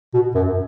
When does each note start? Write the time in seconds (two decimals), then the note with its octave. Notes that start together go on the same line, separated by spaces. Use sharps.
0.14 B2
0.35 F#2